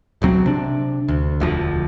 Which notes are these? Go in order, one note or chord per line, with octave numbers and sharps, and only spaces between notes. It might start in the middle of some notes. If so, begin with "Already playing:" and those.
D1 B1 F#3 C4
C3 D4
D2
E1 D2 F3